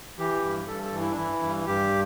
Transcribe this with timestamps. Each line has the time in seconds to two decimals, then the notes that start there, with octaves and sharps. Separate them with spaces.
0.19 E3 G4
0.43 G2
0.67 G2 A4
0.84 A4
0.92 E3
1.01 E4
1.12 D4
1.17 E3 E4
1.42 G2
1.66 G2 G4